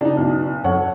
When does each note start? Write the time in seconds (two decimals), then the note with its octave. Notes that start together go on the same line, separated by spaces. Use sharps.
0.01 C#3 D4 D#4
0.17 B1
0.64 F#2 A4 C#5 F#5